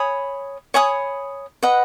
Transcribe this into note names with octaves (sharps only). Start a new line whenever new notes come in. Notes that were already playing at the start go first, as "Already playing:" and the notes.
Already playing: C#5 G#5 B5 D#6
C#5 G#5 B5 D#6
B4 D#5 F#5